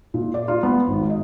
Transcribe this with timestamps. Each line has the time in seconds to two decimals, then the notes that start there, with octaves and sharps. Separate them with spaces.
0.14 A#2
0.34 D5
0.48 F4
0.63 B3
0.88 G#1
1.10 D#5